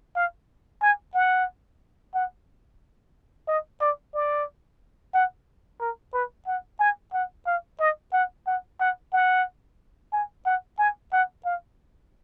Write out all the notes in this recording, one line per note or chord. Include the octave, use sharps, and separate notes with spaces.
F5
G#5
F#5
F#5
D#5
D5
D5
F#5
A#4
B4
F#5
G#5
F#5
F5
D#5
F#5
F#5
F#5
F#5
G#5
F#5
G#5
F#5
F5